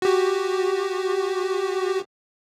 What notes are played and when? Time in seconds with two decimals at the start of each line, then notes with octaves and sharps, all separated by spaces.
0.02 F#4 G4